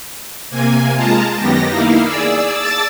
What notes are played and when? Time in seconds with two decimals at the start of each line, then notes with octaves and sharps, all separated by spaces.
0.50 C3 A#3 G#5
0.96 G#3 F4 A5 A#5
1.36 F#2 D#3 B3 G4 A#6
1.68 A#3 D#4 E4 F5
2.05 G#4 D5 E6
2.53 A5 D6 E6 A6